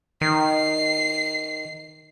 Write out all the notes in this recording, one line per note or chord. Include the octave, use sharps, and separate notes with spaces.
D#3 C7